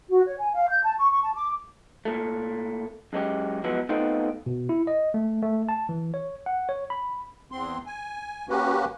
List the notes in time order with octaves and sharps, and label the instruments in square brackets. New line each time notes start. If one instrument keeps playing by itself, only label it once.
[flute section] F#4
C#5
G#5
F5
G6
A5
C#6
C#6
A5
D6
[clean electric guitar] A#2 A3
F#2 G#3 C#4 G4
F3 F#3 G#3 B3 E4
A3 B3 C4 D#4 F4
[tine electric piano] B2
E4
D#5
A3
A3
A5
E3
C#5
F#5
C#5
B5
[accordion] E2 C4 C6
G#5
A#3 C#4 F#4 G4 B4